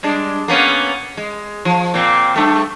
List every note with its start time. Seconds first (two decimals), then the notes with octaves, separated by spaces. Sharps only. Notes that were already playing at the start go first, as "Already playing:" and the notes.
0.03 G3 G#3 D4
0.48 A#3 B3 C#4
1.17 G#3
1.65 F3
1.94 A#2 C4
2.36 G2 A3